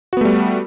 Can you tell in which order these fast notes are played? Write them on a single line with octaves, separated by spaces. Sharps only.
F#4 B3 A3 G3